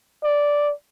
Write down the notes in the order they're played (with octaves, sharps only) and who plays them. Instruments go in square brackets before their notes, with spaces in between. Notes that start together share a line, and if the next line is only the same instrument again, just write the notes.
[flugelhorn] D5